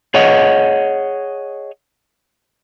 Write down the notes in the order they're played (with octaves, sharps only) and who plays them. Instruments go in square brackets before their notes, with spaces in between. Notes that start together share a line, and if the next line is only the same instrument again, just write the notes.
[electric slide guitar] G#4 C#5 D#5 F#5